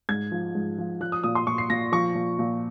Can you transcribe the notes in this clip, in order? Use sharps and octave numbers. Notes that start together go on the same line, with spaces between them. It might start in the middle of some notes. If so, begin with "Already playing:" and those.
G#2 G#6
F3
G#2
F3
F3 F#6
D#6
A#2 D#6
C6
A#2 C#6
C7
A#2 A#6
F3 C#6
A#2
A#2